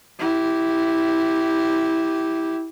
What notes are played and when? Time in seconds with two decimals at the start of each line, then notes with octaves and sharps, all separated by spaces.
0.20 E4 G4